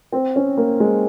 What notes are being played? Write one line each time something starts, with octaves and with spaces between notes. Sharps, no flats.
C4
C#4
A#3
G#3